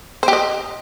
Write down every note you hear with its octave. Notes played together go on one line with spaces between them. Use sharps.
C5
G4
D#5